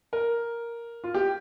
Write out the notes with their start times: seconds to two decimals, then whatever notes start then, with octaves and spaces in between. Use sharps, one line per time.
0.13 A#4
1.04 F4
1.15 G4